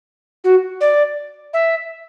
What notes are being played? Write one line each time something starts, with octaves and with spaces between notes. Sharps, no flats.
F#4
D5
E5